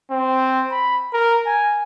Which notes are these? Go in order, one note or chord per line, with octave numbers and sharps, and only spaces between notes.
C4
B5
A#4
G#5